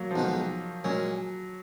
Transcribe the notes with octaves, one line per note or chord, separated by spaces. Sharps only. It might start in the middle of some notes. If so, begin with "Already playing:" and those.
Already playing: F#3 A#3
F3
B1 B2 D#3 G#3 B3 F4
A#2 F#3 G#3 C#4 G#4